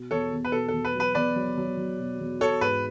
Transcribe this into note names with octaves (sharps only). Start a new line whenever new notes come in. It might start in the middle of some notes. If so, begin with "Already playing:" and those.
Already playing: B2
E2 A4 C#5
E2
B4
B2 A4
E2 A4
B4
F#3
B4
E2 B4 D5
F#3
F#3
F#3
B2
E2
F#4 A4 C#5
G#2 B4